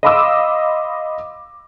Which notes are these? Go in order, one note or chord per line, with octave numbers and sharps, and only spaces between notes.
D#5 F5 B5 C6 D6 E6